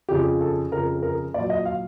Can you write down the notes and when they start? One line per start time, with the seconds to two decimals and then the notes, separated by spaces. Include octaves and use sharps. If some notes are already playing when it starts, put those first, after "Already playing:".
0.09 F2 C#3 F3 G4
0.41 A4
0.72 F2 C#3 F3 A#4
1.03 A#4
1.34 A#2 F#3 D5
1.50 D#5
1.65 F5